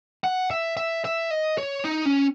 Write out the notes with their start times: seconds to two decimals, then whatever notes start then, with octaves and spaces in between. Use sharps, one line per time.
0.24 F#5
0.51 E5
0.77 E5
1.05 E5
1.31 D#5
1.58 C#5
1.84 D#4
2.05 C#4